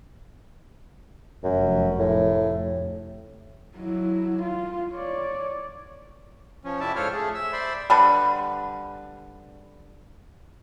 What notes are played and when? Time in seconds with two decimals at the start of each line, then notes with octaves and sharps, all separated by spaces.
1.44 F1 F#2
1.99 A2
3.77 F#3 E4
4.42 F4
4.93 C#5 D5
6.65 F3 C#4
6.80 F2 C3 E4 D5 E5 A5
6.96 G#2 F4 A4 C5 C#5 F6
7.12 A3 G#4
7.35 E5 E6
7.53 C5 D5 E5 B5 C6
7.90 D3 G3 B4